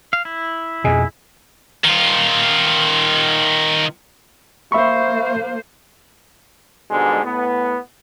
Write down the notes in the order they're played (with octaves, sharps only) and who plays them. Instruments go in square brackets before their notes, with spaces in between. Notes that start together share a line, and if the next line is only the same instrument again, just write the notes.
[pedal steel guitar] F5
E4
[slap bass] F2 B2 [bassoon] G#3
[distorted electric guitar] D#3 F4
[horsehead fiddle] A#3 C5 [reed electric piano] E5 B5 C#6
[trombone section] G#2 B2 D3 G3 G#3
A2 B3